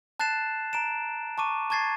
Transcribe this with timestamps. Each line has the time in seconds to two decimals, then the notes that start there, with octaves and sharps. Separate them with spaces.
0.19 A5 F#6 A6 C7 E7
0.73 A#5 D7 E7
1.38 A5 C#6 D6 D#7
1.70 A5 C#6 G#6 A6 C7